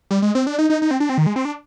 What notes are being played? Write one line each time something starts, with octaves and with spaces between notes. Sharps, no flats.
G3
G#3
C4
D4
D#4
D#4
D#4
C4
D4
C4
D#3
G#3
C4
D4